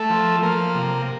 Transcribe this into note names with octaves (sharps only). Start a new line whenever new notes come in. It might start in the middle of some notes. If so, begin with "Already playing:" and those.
Already playing: A3 A4
F3
F3 A#3 A#4
C3